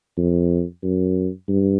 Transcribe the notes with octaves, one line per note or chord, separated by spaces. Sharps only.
F2
F#2
G2